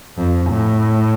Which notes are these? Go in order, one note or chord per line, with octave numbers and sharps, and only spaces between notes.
F2
A2